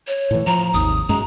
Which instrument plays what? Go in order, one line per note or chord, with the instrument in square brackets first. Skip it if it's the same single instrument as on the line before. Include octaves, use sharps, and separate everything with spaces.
[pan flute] C#5
[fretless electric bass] A2 E3
[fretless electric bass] F3 [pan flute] A#5
[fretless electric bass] G#1 D#2 [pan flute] D#6
[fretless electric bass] F#2 G#3 [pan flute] A#5